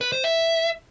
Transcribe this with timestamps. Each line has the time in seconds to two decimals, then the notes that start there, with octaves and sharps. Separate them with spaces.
0.01 B4
0.12 C5
0.24 E5